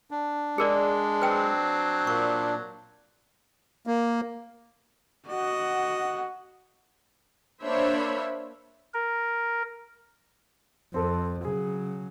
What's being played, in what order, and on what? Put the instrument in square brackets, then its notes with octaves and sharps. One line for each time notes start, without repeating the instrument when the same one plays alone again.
[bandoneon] D4
[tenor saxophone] G#3 [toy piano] G#4 A#4 D5
[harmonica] F#3 C4 [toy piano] B4 G5
[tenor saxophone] A#2 [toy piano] C#6
[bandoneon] A#3
[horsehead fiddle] F#4 F#5 [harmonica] D#5
[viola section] A#3 D4 C5 C#5 E5 B5
[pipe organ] A#4
[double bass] F2 [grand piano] C4 A4
[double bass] C#3 F#3 [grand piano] G#4